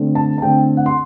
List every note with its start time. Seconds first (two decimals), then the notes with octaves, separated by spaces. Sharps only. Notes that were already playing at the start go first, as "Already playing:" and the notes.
Already playing: D3 A3 C4
0.15 A5
0.38 A5
0.42 D3 A3 C4 G5
0.77 F#5
0.86 C6